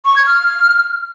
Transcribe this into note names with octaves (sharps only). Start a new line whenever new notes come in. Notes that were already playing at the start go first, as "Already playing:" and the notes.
C#6
G#6
F6